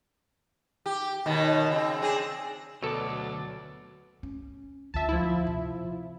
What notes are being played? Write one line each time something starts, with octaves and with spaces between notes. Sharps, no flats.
G4
D#2 B2 D#3
C#3 C4
C4 D4 G#4
D2 B2 F#3 A4 D5
C#4
D2 F4 E5 A5
F3 E4
C3